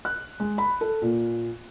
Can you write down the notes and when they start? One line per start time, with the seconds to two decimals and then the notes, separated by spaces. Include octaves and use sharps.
0.05 F#6
0.40 G#3
0.58 B5
0.81 A4
1.02 A#2